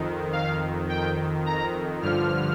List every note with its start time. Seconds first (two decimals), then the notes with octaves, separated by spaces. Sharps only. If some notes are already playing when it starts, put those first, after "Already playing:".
Already playing: F2 D#3
0.33 F5
0.89 G5
1.46 A#5
2.02 G2 D3 F3 F6